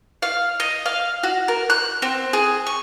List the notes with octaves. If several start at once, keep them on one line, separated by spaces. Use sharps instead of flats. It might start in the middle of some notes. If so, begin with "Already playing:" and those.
F5
D#5
F5
F#4
A#4
F#6
C4
G#4
C#6